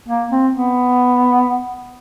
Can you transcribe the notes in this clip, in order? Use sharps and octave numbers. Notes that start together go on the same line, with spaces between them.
A#3
C4
B3